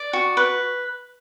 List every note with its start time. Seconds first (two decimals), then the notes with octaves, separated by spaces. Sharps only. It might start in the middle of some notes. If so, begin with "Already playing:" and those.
Already playing: D5
0.13 F#4
0.37 B4